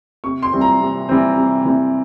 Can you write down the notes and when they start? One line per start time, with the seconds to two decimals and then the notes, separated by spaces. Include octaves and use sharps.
0.24 C3 C#6
0.42 C6
0.53 E3 G3 C4
0.61 A#5
0.80 C3
1.09 E3 G3 C4
1.37 C3
1.65 E3 G3 C4